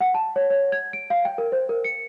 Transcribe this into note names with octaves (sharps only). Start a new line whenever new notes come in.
F#5
A5
C#5
C#5
G#6
D7
F5
G5
A#4
C5
A#4
C#7